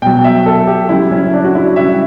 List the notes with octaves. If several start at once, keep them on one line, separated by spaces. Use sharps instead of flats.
B2 F#3 G5
E5
A4
G4
C#3 F#3 E4
C#4
D4
F#4
E4
C#3 G3 E5